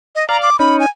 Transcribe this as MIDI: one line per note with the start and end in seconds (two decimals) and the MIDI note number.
0.15 0.27 75
0.29 0.50 74
0.29 0.50 77
0.29 0.37 82
0.42 0.59 86
0.59 0.86 61
0.59 0.86 63
0.59 0.77 83
0.80 0.88 80